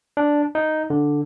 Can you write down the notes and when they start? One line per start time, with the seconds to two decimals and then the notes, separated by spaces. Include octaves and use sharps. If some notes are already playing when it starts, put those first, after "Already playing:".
0.17 D4
0.55 D#4
0.90 D3